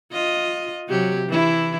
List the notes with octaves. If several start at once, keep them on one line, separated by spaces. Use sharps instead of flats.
F4 D#5
C3 F#3 G4
E3 E4